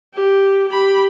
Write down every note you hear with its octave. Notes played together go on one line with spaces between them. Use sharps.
G4
G4 B5